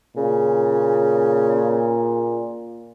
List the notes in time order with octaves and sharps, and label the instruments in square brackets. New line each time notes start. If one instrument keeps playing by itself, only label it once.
[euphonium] A#2 [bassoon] C#3